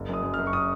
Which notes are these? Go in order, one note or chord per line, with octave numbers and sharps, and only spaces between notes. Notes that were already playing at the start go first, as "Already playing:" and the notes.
Already playing: F#1
F#2 D#6
F#2
F6
F#2
C#6
D#6